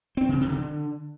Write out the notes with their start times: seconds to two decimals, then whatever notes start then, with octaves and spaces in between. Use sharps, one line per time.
0.17 C4
0.29 C#3
0.41 C3
0.52 D3